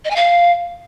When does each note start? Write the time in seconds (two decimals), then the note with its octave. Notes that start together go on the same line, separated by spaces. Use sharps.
0.05 D#5
0.10 G#5
0.16 F5